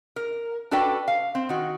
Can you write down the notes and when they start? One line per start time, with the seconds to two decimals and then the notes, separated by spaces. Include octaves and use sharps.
0.16 A#4
0.71 D4 F#4 A4 B4 D5 G5
1.08 F5
1.35 C4
1.49 D#3 F#4